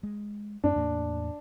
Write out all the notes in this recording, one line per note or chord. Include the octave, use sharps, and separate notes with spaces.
G#3
F#2 D4
E2 A2 A#3